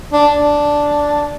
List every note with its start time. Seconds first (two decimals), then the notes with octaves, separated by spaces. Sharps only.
0.13 D4
0.31 D4